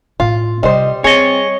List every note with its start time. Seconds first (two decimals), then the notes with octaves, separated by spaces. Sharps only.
0.20 A2 F4
0.63 C3 G3 C#4 C5 D#5
1.04 G3 C4 G#4 C#5 D#5